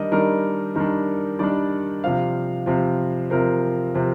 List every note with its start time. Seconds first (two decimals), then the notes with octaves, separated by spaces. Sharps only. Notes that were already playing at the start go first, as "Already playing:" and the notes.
Already playing: D#3 G3 D4 A#4 D#5
0.12 D#3 G3 D4 A#4
0.75 D#3 G3 D4 A#4
1.39 D#3 G3 D4 D5
2.04 C3 F3 C4 F5
2.66 C3 F3 C4
3.30 C3 F3 C4 A#4
3.94 C3 F3 C4